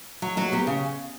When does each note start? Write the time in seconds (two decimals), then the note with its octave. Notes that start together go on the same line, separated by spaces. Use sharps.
0.22 F#3
0.37 F#3 F#4
0.52 B3 G4
0.67 C#3